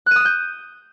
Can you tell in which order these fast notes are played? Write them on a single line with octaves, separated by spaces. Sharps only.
F#6 D#7 D#6 E7 G6